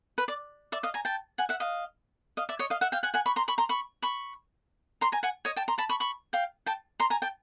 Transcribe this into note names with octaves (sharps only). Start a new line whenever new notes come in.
B4
D5
D5 E5
D#5 F5
G#5 A#5
G5 A5
F#5 G#5
E5 F#5
D#5 F5
D#5 F5
D5 E5
C#5 D#5
D#5 F5
E5 F#5
F5 G5
F#5 G#5
F#5 G#5
B5 C#6
A#5 C6
B5 C#6
A#5 C6
B5 C#6
B5 C#6
A#5 C6
G#5 A#5
F#5 G#5
C#5 D#5
G5 A5
A#5 C6
A5 B5
B5 C#6
B5 C#6
F5 G5
G5 A5
A#5 C6
G#5 A#5
G5 A5